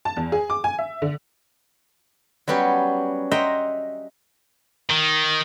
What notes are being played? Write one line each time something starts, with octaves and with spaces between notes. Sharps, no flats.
A5
E2
G#4
D6
G#5
E5
D3
F#3 G3 B3 C#4 G4
D#5 E5 F#5 G5 A#5 C6
D#3